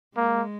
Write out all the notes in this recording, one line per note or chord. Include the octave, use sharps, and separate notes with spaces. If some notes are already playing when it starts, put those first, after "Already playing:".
G#3 A#3